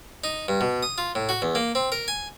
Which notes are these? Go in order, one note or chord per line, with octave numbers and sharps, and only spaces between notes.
D#4
G2
B2
D#6
F4
A2
F#4
E2
A#3
C4
A#4
G#5